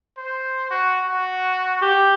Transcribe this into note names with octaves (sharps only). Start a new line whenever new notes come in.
C5
F#4
F#4
G4